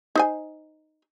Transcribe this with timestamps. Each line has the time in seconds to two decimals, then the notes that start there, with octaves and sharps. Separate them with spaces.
0.15 D#4 C5 G#5